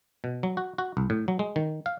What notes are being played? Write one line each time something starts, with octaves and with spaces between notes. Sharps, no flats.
B2
F#3
F#4
F#4
C2
A2
F#3
G#3
D#3
F5